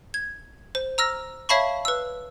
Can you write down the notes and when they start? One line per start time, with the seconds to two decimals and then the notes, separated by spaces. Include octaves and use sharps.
0.14 G#6
0.75 C5
0.98 A#5 E6 F6 A#6
1.49 C#5 E5 F5 A5 B5 C#6
1.85 B4 E6